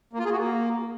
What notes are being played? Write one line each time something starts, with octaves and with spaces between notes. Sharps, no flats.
A#3
F4
G#4
F#4
A#3